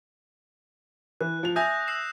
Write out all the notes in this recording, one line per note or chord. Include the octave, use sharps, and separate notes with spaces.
E3 F#6
F3 F7
E5 G#5 D#6 G6 A#6
E6 C7 E7